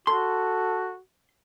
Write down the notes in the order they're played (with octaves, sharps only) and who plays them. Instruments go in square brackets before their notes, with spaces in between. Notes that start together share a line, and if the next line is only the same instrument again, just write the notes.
[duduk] F#4 [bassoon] A4 [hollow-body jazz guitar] C6